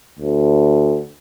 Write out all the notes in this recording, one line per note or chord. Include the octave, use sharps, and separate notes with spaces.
D2